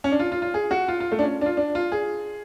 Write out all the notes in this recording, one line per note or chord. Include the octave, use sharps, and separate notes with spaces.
C#4
D4
F4
F4
F4
G#4
F#4
F4
F4
A3
D4
C#4
D4
F4
D4
F4
G#4